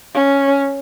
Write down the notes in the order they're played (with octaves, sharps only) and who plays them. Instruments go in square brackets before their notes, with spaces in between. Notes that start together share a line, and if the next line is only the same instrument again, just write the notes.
[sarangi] C#4